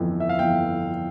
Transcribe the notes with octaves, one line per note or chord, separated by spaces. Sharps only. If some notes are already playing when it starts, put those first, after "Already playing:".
Already playing: G1 F2 E3
E5
F5
G1 F2 E3 G5